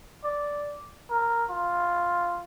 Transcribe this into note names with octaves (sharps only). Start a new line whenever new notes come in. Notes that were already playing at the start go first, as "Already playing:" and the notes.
D5
A#4
F4